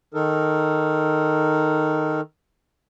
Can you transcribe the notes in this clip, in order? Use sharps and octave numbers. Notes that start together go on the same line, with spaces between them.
D#3 D#4 A4 A#4